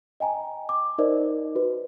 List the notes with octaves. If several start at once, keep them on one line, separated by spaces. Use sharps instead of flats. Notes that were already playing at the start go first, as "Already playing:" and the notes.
D#5 G5 G#5 A#5
D6
D#4 A#4 C5 D5 D#5
F#4 B4